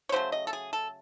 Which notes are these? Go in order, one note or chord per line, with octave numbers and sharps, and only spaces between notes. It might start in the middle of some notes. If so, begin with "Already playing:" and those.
C#5
C#3 F#3 A3 C5
D#5
A4
G#4
A4